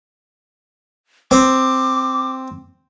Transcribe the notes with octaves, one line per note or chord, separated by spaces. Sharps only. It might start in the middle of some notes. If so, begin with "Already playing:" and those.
C4 D6